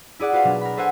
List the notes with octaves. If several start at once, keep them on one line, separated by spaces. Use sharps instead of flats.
E4 G#4 D5 F#5
F4 F#4 B4 C5 F5
B2 F#3 D4
A#4 B5
A4 B4 C5 E5 F#5 G#5